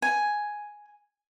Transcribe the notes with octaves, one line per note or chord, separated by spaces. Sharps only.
G#5